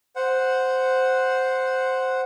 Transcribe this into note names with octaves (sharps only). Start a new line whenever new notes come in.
C5 F#5